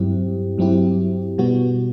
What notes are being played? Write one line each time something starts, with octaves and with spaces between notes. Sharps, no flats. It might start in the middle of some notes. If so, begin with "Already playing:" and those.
Already playing: G2 F#3 C4 E4 G4
G2 F#3 C4 E4 G4
B2 G3 B3 F#4